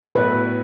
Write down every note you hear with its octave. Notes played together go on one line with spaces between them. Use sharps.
A2 F#3 B3 E4 B4 D5